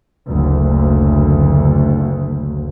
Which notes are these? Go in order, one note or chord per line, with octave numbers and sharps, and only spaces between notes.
F#1 D2